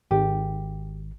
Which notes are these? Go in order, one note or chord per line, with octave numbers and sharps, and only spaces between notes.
G#1 G4